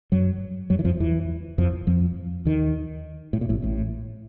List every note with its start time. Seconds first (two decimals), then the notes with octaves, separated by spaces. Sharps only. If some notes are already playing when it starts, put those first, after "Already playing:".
0.12 F#2 F#3
0.70 F#2 F#3
0.79 E3
0.85 F2 F3
1.00 E2 E3
1.58 F2 F3
1.87 F2 F3
2.45 D#2 D#3
3.33 A2
3.41 A#2
3.49 A1 A2
3.62 A1 A2